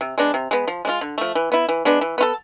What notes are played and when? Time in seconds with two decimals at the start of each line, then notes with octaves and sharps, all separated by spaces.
0.01 C3
0.18 G#3 B3 D4
0.34 C3
0.51 G#3 B3
0.68 F3
0.85 G#3 D4 F4
1.01 D3
1.18 F3 A3
1.35 E3
1.52 B3 E4
1.69 E3
1.85 G#3 B3 D4
2.01 E3
2.18 B3 F4 A4